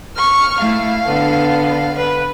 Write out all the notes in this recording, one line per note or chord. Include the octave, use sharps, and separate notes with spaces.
C#6 F6
A3 E4 F5
D3 B3 A4
B4